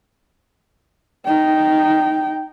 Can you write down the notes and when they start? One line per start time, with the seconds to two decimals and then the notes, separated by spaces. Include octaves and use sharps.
1.25 D#4 G5